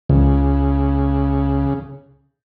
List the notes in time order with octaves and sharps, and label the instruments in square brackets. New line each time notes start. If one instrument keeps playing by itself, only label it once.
[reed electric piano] C#2 [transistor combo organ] C#3